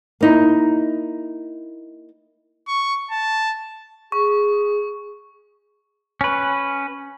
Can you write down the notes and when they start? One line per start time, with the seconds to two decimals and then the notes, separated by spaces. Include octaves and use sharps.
0.21 A#3 D#4 E4
2.68 C#6
3.11 A5
4.12 G#4 C#6
6.21 C#4 B4